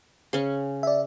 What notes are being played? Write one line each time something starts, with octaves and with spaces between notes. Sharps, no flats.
C#3 C#4
D5 E5